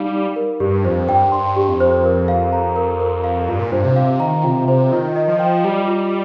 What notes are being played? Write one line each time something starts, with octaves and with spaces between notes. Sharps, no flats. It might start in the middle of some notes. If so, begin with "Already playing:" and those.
Already playing: G3 D#4 F5
D#4
A#4
G2 G4
F2 C5
G2 G5
G2 C6
G4
F2
C5
A#4
F5
A#5
A#4
A#4
F5
G2 F4
A#2
G2 C5
C3
F5
D#3 A#5
C3 F4
C3 C5
D#3 F4
D#5
F3
G5
G3 F4
F4